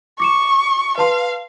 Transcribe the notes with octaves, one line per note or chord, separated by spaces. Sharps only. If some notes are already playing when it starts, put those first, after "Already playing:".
C#6 D6 C#7 E7
B4 F5 A5 C6